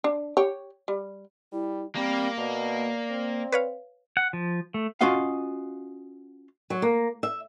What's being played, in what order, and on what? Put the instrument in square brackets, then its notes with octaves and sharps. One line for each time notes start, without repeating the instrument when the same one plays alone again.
[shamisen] D4
G4 C#5
G3
[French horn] G3 [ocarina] E4
[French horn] G3 [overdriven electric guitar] A#3 [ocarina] C4
[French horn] B2 [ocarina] D5
[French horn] C4
[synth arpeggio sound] B4 C#5 F5
[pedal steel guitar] F#5
F3
A3
[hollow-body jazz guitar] C#4 F4 F#4 D#5 F5 F#5
[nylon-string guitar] F#3
A#3
E5